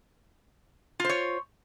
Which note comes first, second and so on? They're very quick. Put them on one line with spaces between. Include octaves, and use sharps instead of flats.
F4 C5 C#5